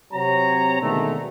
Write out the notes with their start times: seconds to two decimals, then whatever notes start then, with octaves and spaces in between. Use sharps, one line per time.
0.13 C3 F#3 C4 C#5 A#5
0.81 B2 D3 D#3 G#3 A3